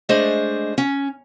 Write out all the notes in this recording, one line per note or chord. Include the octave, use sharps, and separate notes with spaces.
G#3 A3 D4 G#4 C5 D#5
C#4